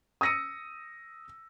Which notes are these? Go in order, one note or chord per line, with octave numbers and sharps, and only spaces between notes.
D#6 E6 A#6 C#7 D#7